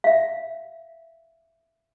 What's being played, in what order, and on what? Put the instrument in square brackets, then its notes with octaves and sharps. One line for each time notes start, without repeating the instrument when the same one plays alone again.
[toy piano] E5 F5